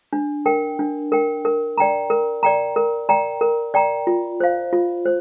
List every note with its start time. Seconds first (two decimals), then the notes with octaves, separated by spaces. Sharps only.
0.13 D4
0.46 A#4 G5
0.79 D4
1.12 A#4 G5
1.45 A#4
1.78 D5 G5 A#5
2.10 A#4
2.43 D5 G5 A#5
2.76 A#4
3.09 D5 G5 A#5
3.41 A#4
3.74 D5 G5 A#5
4.07 F4
4.40 C5 F5
4.73 F4
5.06 C5